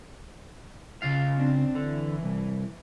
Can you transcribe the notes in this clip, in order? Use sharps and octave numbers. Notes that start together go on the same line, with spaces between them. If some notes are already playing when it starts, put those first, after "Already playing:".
C#3 F4 F5
C4 D4
D3 E3
C2